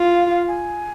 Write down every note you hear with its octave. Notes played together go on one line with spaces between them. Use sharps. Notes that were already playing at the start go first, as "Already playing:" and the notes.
Already playing: F4
F5
F5
G#5